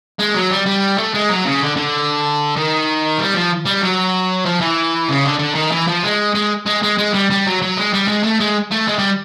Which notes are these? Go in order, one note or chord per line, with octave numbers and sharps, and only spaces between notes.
G#3
F#3
G3
G3
A3
G#3
F#3
C#3
D3
D3
D#3
G3
F3
G3
F#3
F3
E3
C#3
D3
D3
D#3
E3
F3
G#3
G#3
G#3
G#3
G#3
G3
G3
F#3
F#3
G#3
G3
G#3
A3
G#3
A3
G#3
G3